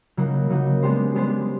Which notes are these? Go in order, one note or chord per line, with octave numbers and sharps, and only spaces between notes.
C#3 F#3 A#3 D#4 F#4
C#3 F#3 A#3 D#4 F#4
G#3 B3 D4 G4 C5
G#3 B3 D4 G4 C5